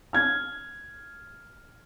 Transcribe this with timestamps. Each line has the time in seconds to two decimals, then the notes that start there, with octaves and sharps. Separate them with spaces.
0.13 F6 G#6